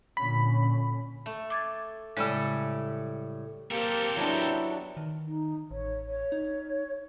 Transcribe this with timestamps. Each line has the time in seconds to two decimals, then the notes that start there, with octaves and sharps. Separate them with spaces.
0.17 A#2 D3 C#4 B5
1.26 A3
1.50 D6 G#6 A6
2.17 A2 C#3 G3 G#3 A4
3.71 A#3 C4 G4 A4 A#4
4.16 F#3 B3 D4 E4
4.97 D#3
5.26 D#4
5.71 A1 C#5
6.07 C#5
6.32 D#4